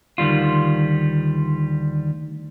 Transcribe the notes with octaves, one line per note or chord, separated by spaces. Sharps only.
D2 D#3 G3 F4